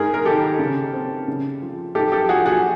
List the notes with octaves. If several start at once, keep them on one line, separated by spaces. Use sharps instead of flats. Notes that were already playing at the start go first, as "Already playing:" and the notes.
Already playing: G#2 G#4 A#4
A#4
D#3 G4 A4
C#3
C4
C#3
F3
G#2 G4 A4
G4 A4
F3 F#4 G#4
F#4 G#4